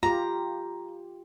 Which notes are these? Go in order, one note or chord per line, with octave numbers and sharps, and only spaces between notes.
F4 G4 A#5